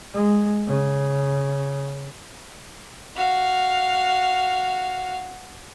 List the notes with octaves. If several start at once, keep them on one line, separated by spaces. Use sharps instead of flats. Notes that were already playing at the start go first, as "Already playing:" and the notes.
G#3
C#3
F#4 F5